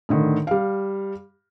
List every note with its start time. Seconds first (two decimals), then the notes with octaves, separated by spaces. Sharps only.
0.09 A2 D3 D#3
0.47 G3 F5